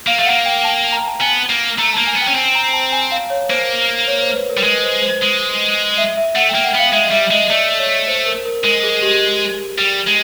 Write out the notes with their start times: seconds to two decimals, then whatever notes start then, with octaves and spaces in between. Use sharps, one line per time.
0.07 A#3 F5
0.19 A3 F5
0.26 A#3 F#5
0.46 G5
0.64 A5
0.92 A#5
1.07 A5
1.21 B3 G#5
1.49 A#3
1.78 A3 A#5
1.93 A#3 A5
2.07 G#5
2.16 B3
2.22 G5
2.28 C#4
2.35 C4 G#5
2.55 A#5
2.73 A5
2.92 G#5
3.12 F5
3.30 C#5
3.49 A#3 C5
4.08 C#5
4.22 C5
4.35 B4
4.50 A#4
4.57 G3
4.64 G#3 B4
4.83 C5
5.02 C5
5.22 G#3
5.98 E5
6.17 E5
6.35 A3 F#5
6.49 A#3 G5
6.64 F#5
6.74 B3 F5
6.92 G#3 E5
7.11 G3 E5
7.31 G#3 D#5
7.50 A3 D5
7.79 C#5
8.08 C5
8.26 A#4
8.45 A#4
8.64 G#3 A#4
8.84 G#4
9.02 G4
9.78 G3
10.07 G#3